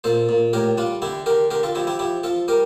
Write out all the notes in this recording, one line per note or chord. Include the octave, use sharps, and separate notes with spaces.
A#2 A4 C5
A#2
A2 G4 A#4
G3 D4 F4
D3 E4 G4
D3 G4 A#4
D3 G4 A#4
F4 A4
F3 E4 G4
E4 G4
F3 E4 G4
F3 F4 A4
G3 G4 A#4